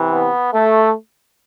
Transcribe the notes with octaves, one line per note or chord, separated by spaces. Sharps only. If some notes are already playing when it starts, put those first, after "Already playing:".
Already playing: C3 E3
B3
A3